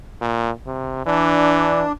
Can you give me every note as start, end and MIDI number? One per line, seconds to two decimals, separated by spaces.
0.21 0.51 46
0.67 1.06 48
1.06 1.85 52
1.06 1.92 62